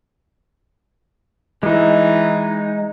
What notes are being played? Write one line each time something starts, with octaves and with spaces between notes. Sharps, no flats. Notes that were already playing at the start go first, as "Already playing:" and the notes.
E3 G#3 D#4